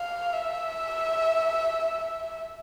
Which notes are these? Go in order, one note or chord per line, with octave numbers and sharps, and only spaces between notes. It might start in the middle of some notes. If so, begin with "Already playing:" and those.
Already playing: F5
E5